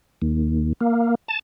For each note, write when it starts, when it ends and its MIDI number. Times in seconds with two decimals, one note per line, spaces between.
0.22 0.73 39
0.81 1.15 58
1.28 1.39 81